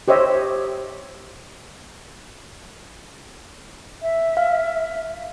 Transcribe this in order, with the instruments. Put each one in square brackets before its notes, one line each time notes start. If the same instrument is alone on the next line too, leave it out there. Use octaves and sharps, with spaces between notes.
[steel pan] G4 C5 C#5 D#5 E5
[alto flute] E5
[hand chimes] F5